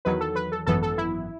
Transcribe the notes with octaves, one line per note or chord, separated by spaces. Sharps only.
E2 D#3 F#3 B4
A4
B4
A4
G#1 F#2 E3 B3 A4
A4
E4